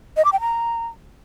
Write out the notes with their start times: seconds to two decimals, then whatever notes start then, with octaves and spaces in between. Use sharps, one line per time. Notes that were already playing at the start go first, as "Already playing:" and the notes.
0.17 D#5
0.25 D6
0.33 G5
0.40 A#5